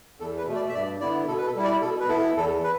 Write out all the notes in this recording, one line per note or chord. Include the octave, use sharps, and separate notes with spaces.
E2 A4
B4
B2 A3
D5
E5
G2 D5
D3 B3 E4 D5
B2 A4
B4
A4
G3 E4
D5
B2 A4
B4
B3 E4 A4
E2 A4
B4